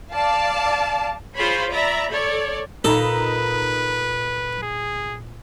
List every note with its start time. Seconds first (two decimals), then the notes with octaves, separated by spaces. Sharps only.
0.12 D5 F5 A5
1.36 F4 G#4 C5 C#5 B5
1.71 D5 E5 A#5 B5
2.10 A4 C#5 D5
2.84 A#2 D#4 A4 B4 A#5 B5
4.63 G#4